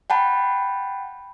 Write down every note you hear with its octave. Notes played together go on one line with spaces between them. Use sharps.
F#5 G5 A5 B5